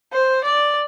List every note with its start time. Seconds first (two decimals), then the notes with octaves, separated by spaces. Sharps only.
0.13 C5
0.44 D5